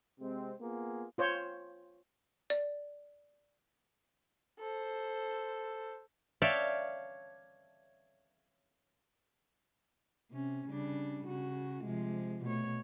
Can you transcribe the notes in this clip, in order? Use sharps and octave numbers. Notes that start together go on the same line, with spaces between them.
C3 G#3 C4
A#3 B3 F4 G#4
F4 C5 C#5
D5
A4 C5
C#5 D5 E5 F5 G5 A5
C3 C#4
C#3 G3 D4
C#3 F#4
C3 F3 G#3
B2 A3 C#5